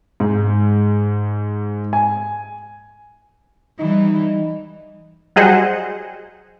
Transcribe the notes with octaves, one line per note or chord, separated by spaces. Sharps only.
G#2
G#5
E3 G3 D#4
F#3 G3 G#4 C5 D#5 F#5